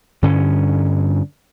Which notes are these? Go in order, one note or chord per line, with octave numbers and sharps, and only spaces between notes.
G2 D3 C#4